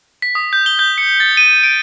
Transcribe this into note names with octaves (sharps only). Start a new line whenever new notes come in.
B6
D#6
G6
G7
G6
C#7
A6
D#7
D7